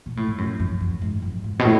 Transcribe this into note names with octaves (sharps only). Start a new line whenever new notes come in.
B2
A2
G#2
F#2
F#2
F#2
G#2
F#2
G#2
B2
A2